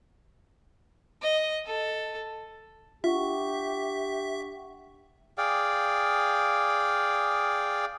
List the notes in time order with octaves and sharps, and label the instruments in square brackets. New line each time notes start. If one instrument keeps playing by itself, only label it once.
[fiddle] D#5
A4
[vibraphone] D4 F#5 C#6 [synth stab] F4 [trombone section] G4 [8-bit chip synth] E5
[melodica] G#4 D5 F5 G5